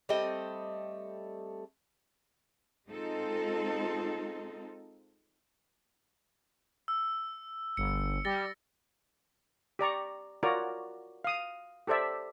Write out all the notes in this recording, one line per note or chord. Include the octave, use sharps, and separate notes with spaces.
G3 A3 C4 D#5
G#3 C4 D#4 F4 A4
E6
G1 C#7
G3 A6 A#6 G7
G4 D5 A#5 C#6
F4 F#4 A#4 C#5 D5 A#5
F5 D#6
G4 A4 C5 D5 E5